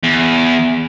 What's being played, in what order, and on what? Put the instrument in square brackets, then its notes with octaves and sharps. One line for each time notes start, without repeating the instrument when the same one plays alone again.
[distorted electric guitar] E2